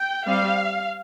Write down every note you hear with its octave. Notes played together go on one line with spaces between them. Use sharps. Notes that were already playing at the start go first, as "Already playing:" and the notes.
Already playing: G5
G3 C4 F5